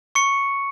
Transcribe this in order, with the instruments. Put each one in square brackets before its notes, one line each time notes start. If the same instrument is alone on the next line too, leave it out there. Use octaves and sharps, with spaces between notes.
[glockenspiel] C#6 C#7